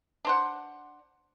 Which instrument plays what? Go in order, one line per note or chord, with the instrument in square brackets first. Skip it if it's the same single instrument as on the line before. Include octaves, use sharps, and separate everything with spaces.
[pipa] D4 C5 F#5